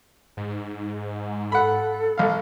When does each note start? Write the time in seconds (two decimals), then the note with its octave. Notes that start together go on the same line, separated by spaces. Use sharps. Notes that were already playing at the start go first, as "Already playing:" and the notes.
0.37 G#2
1.52 A4 F#5 B5
2.18 A#1 F5